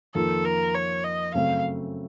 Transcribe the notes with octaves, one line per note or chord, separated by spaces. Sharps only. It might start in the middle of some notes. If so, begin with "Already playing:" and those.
F2 D#3 A#3 F4 A4
A#4
C#5
D#5
F#2 C#3 A3 C4 F5